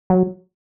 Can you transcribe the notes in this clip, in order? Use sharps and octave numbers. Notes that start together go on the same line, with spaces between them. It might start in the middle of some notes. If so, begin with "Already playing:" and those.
F#3